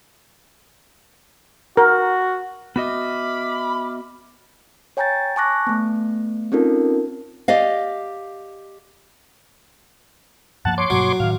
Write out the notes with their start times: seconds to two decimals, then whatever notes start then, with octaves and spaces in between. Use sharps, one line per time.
1.77 F#4 A#4
2.76 B3 F#4 D#5 E5 B5 D6 F6
4.97 C#5 G5 G#5 A#5 G6 A6
5.36 G#5 A5 C#6 D6 F#6 A#6
5.67 A3 B3
6.52 C4 C#4 D#4 F4 A4 A#4
7.48 G4 D5 D#5 F5
10.65 G2 F3 A#3 F#5 A5
10.78 C#5 C6 D6
10.90 G2 B2 F#3 A#3
11.20 A2 D#3 F5